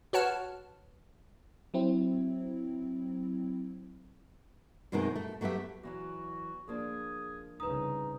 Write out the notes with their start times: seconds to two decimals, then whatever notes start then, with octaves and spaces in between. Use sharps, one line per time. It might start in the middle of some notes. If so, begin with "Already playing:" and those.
0.13 F#4 B4 C#5 F#5 A5 F6
1.74 F#3 C4 E4
4.92 F#2 B2 D#3 G#3 C4 D#4
5.16 A3
5.41 F#3 A3 B3 G4 E5
5.83 E2 E3 F#3 F#4
6.68 F3 A#3 D4 G#4
7.60 C2 C#3 D#4 B4 D#6